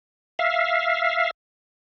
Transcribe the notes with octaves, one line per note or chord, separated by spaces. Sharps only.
E5 F5